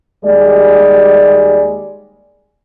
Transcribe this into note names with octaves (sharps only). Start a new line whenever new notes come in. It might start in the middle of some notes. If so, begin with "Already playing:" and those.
D#2 G3 G#3 D5